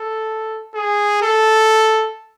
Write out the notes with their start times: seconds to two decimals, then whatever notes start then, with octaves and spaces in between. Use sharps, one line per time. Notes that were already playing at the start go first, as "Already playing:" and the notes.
Already playing: A4
0.75 G#4
1.22 A4